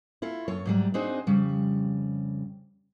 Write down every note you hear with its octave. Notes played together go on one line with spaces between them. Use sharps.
E4 F4 A4
F#2 A4 C#5
G#2 F#3 G3
C4 D4 D#4 F#4 G#4 C5
F2 C#3 G3